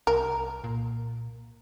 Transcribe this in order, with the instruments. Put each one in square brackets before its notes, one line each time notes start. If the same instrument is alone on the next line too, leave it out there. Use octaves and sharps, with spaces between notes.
[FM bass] C2 [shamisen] A#4
[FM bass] A#2